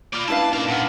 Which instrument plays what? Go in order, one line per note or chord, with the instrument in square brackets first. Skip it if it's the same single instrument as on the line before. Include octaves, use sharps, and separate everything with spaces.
[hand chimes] A#3 B5 F#6 [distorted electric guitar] F4 D5
[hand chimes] C#4 D4 [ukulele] E4 B4 F5 [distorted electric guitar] A5
[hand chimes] C#4 D#4 [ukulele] A#4 [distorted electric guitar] D5 F5
[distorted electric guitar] A#2 B3 [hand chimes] F5 F#5 F6